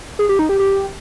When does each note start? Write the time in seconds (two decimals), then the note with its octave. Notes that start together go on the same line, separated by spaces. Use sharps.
0.19 G#4
0.29 G4
0.39 D#4
0.49 G4
0.59 G4